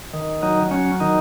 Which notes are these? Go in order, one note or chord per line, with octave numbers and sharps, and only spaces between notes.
D#3
F#3 D#4
F#3 C#4
D#3 D#4